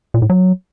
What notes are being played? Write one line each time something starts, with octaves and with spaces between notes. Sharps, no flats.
A#2
A2
F#3